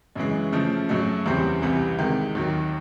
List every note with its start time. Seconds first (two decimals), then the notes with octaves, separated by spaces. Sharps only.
0.16 F#2 C#3 E3 G#3
0.52 C#3 F3 A3
0.89 F#2 C#3 F#3 A3
1.25 E2 C#3 E3 G3 C4
1.62 C2 C3 E3 G3
1.99 C3 D#3 G#3
2.35 D#2 D#3 F#3